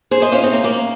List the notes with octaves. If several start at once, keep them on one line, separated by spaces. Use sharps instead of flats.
G#4 C5
C5 D#5
C#4 F4
C4 D#4
A#3
A#3 C#4